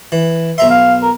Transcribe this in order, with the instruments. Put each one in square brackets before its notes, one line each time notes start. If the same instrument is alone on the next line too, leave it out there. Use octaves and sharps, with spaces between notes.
[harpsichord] E3
[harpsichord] B1 A#5 C6 [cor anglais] E5
[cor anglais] F5
A#4